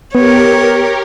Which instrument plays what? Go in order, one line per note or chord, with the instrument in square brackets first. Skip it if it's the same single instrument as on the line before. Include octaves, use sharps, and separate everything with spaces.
[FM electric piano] B3 [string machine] G4 A#4 [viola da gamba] C#5